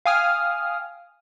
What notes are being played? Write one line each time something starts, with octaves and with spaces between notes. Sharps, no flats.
F5 G5 G#5 D#6 F6